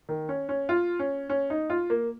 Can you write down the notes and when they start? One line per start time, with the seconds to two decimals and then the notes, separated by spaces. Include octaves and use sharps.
0.09 D#3
0.29 C#4
0.49 C#4
0.69 F4
0.99 C#4
1.29 C#4
1.50 D#4
1.70 F4
1.90 A#3